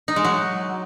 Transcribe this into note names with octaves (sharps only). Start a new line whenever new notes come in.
D#4
G#3
F#3